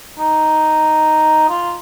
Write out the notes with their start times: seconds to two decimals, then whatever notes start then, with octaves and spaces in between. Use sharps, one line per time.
0.19 D#4
1.49 F4